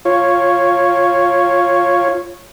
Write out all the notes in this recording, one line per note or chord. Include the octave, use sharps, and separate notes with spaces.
F4 C#5